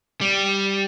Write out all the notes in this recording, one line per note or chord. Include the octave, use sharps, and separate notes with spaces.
G3